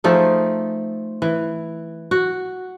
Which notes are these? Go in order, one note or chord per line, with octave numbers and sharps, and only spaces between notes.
F3 A3 D#4 G#4
E3
F#4